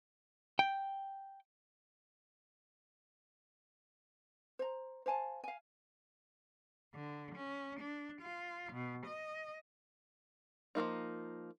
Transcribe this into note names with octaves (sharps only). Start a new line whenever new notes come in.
G5
C5 A#5
C5 F5 G#5 A5
F5 G#5
D3
C#4
D4
F4
B2
D#5
F3 G3 A#3 D#4